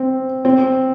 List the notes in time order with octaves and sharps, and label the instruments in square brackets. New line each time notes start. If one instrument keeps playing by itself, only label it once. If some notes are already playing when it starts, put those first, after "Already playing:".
Already playing: [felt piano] C4
C4